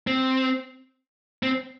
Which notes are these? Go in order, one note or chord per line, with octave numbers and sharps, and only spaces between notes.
C4
C4